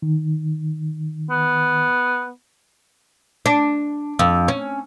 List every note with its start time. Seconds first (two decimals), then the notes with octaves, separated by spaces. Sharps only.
0.02 D#3
1.30 B3
3.46 D4
4.19 F2
4.48 C#4